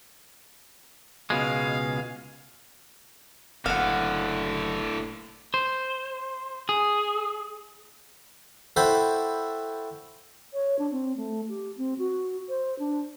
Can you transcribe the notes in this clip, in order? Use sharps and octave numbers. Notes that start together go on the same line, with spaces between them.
C#2 B2 G#3 F5
F#1 A2 D3 F5 F#5
C5
G#4
E4 F#4 A4 C5 G5 B5
C#5
D4
C4
A3
G4
C4
F#4
C5
D4